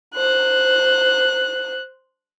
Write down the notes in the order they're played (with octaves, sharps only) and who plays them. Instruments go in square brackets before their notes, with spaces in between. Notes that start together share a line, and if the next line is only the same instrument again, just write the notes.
[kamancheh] C5 F#6